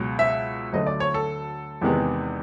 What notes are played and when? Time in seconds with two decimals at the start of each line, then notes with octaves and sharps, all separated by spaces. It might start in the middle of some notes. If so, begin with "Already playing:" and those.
Already playing: C#2 B2 F#3
0.19 E5
0.73 D2 D3 F#3 A3 D#5
0.87 D5
1.00 C#5
1.14 A4
1.81 E2 C3 D#3 G#3 B3